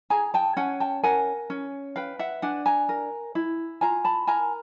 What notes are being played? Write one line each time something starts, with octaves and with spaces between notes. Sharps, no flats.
G#4 G#5 A#5
G5 A5
C#4 F#5 G#5
G5 A5
A#4 F#5 G#5
C#4
B4 F5 G5
E5 F#5
D4 F#5 G#5
G#5 A#5
A#4
E4
F4 G#5 A#5
A5 B5
A#4 G#5 A#5